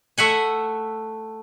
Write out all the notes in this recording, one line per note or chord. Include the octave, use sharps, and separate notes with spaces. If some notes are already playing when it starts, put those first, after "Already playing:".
A3 E5 F#5 G#5